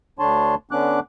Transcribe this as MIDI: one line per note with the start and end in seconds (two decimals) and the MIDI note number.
0.19 0.55 38
0.19 0.55 50
0.19 0.55 62
0.19 0.55 73
0.19 0.55 81
0.19 0.55 84
0.71 1.00 50
0.71 1.00 59
0.71 1.00 61
0.71 1.00 62
0.71 1.00 86
0.71 1.00 90